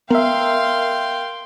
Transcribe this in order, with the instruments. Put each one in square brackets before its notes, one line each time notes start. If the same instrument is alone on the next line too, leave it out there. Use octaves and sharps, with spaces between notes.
[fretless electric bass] B3 [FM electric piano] A#4 E5 [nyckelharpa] F5 C6 [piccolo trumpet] G5